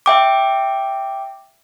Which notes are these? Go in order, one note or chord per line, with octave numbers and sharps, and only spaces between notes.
E5 G5 D6